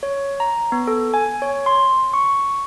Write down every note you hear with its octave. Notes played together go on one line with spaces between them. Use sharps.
C#5
A#5
B3
A4
G#5
C#5
C6
C#6